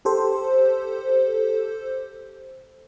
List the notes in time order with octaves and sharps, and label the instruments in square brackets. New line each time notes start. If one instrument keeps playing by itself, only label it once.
[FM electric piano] G4 A4 C5